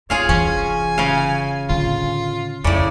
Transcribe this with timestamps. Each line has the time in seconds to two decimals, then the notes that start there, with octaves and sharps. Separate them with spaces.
0.10 D3 C4 F4 G#4 C#5 F5
0.29 F1 E3 C#4 G#5
0.98 C#3 F5
1.70 A2 D3 F4
2.64 F2 A2 C#3 D5